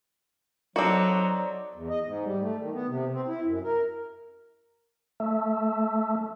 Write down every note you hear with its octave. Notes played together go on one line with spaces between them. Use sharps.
F#3 C4 D#4 F#4 A4 D5
E2
D#5
G#2
G3
A3
D#3
B3
C3
C4
E4
F#2
A#4
A3